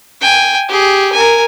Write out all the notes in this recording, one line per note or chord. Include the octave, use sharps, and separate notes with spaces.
G5 G#5
G4 G#4
A#4 G#5